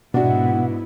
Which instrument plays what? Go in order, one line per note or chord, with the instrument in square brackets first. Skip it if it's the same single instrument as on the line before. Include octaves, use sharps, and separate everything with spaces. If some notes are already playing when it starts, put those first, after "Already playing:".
[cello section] G#2 B3 E4 [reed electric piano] B2 [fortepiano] D4 F#4 [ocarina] F#5